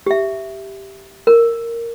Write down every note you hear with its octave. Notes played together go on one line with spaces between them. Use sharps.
G4 E5
A#4